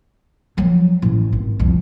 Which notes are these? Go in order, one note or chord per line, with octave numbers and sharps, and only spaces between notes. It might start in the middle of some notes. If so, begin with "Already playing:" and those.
F3 F#3
A1
G#1
C2 F2